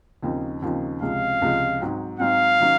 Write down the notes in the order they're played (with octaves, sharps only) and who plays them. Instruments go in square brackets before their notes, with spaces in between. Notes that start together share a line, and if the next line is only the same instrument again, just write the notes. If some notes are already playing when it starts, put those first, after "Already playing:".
[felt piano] D#2 C#3 F3 C4 D#4
D#2 C#3 F3 C4 D#4
[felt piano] C#2 C3 F3 G#3 [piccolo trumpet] F5
[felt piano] C#2 C3 F3 G#3
G#2 F#3 C4
[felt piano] G#2 F#3 C4 [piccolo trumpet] F5
[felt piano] D#3 F#3 C#4